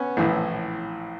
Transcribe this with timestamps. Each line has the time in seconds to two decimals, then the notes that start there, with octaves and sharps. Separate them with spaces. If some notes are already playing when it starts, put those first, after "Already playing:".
Already playing: B3 C#4
0.17 A#1 A2 E3